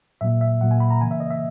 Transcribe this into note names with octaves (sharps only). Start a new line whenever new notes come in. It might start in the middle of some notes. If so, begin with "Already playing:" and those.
A#2 F#3 A#3 E5
E5
A#2 F#3 A#3 F#5
G#5
B5
A#5
C#3 E3 A#3 G#5
E5
D#5
E5